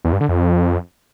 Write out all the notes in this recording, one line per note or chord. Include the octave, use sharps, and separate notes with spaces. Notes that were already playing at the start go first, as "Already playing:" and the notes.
E2
G2
D3
F2